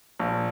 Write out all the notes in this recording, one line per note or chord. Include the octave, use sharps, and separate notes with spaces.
A#1